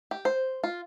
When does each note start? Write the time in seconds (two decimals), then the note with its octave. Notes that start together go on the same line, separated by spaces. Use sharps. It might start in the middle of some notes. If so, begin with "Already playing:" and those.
0.11 G4
0.25 C5
0.64 F4